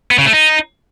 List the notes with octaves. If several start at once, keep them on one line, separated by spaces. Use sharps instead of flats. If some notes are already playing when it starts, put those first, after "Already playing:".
B3
C#3
A3
D#4